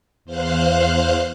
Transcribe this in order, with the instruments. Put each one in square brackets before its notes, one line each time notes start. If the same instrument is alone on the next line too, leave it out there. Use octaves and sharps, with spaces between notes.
[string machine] E2 C5 F5 F#6